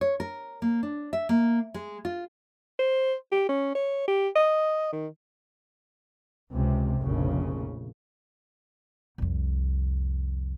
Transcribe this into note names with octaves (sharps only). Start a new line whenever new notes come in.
C#5
A#4
A#3
D4
E5
A#3
G#3
F4
C5
G4
C#4
C#5
G4
D#5
D#3
C#2 C3
F1 A#1 C#3
C2 F2